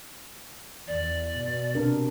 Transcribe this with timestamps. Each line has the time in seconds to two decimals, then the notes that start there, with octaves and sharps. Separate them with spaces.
0.88 E2 D5
1.40 B2
1.75 C3 D4 A#4